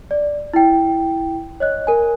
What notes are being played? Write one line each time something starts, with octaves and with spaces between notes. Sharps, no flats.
D5
E4 G5
C#5 D#5 F#6
A#4 G#5